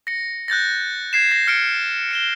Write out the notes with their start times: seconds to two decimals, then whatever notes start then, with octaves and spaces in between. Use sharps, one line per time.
0.07 A#6 C#7
0.48 F#6 G6 A6 A#6
1.13 G#6 C7 E7
1.31 A#6
1.47 F6 C#7 D7
2.11 C#7 E7 G7